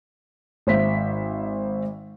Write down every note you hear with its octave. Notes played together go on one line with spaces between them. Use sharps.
G#1 C5 E5 B6